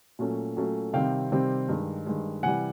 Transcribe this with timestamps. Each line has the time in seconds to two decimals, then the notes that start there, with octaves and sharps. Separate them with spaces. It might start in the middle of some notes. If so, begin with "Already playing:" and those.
0.19 A#2 F#3 A3 C#4
0.57 A#2 F#3 A3 C#4
0.93 C3 D#3 G3 C4 F5 G5
1.32 C3 D#3 G3 C4
1.69 G2 D#3 G#3
2.06 G2 D#3 G#3
2.43 C3 E3 G3 F#5 G#5